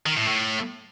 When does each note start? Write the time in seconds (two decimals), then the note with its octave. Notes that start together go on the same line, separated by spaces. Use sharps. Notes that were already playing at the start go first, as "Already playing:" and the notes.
0.06 D#3
0.17 A2
0.27 A2